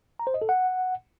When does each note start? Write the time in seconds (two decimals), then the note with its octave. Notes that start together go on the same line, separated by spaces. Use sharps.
0.19 A#5
0.27 C5
0.34 D#5
0.42 A4
0.49 F#5